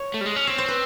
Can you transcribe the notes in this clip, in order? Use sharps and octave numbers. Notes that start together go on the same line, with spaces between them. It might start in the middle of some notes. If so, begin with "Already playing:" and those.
Already playing: C#5
A3
G3
G#3
C#4
C4 C#5
C5
B4